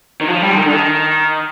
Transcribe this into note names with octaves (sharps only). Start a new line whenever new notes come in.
D#3
F3
G3
D3
D#3
D3
D#3